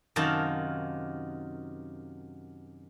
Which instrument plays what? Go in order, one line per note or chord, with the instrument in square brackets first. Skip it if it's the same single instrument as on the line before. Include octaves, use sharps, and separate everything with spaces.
[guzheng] F#2 C3 D#3 F4 F#4 A5